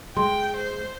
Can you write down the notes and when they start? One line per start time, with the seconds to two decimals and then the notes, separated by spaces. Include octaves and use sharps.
0.17 G#3 G5 C6
0.56 C5